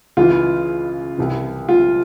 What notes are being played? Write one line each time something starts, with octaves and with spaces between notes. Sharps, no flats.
C#2 C#3 E3 F4
C2 C3 E3
F4